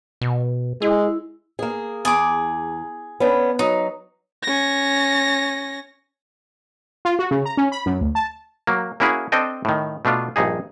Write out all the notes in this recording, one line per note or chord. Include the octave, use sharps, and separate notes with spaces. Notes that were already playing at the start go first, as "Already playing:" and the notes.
B2
G#3 E4 G#4
A#3 G#4
E2 G#4 D6
B3 C#4 D4
F#3 D#4
C#4 A#6
F4
F#4
C#3
A#5
C#4
B5
F#2
D2
A5
F#3 A#3
A#3 C#4 E4 F#4 G#4
C4 D4 A4 D#5 G5
A2 D#3
B2 A3 D4 F4
A#1 G2 D#4 G#4